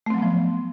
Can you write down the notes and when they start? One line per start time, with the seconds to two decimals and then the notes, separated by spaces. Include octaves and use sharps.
0.06 A3
0.10 C4
0.14 F#3
0.18 B3
0.22 F3